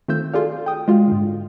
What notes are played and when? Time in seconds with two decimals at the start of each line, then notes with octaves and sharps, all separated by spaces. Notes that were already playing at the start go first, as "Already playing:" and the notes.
0.08 D#3 A3 C4 F4 E6 G6
0.34 F4 F#4 G#4 A4 D5 F5
0.66 G5 D#6
0.88 G#3 F4 F#4 F5
1.08 G#2 D3